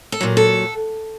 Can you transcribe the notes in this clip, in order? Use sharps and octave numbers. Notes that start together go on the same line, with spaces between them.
A4
A#2 F#3
A4